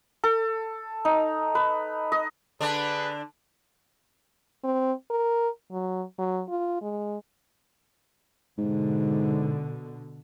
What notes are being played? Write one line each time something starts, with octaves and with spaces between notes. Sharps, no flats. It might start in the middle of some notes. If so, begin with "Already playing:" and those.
A4
D#4
B4
D#5
D3 D4 G#4 B4
C4
A#4
F#3
F#3
F4
G#3
G#2 B2 D3